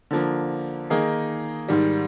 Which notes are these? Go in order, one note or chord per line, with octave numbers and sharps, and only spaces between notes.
D3 F3 A#3
D#3 A#3 D#4 G#4
G#2 D#3 G3